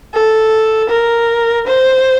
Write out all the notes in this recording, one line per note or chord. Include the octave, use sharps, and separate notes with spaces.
A4
A#4
C5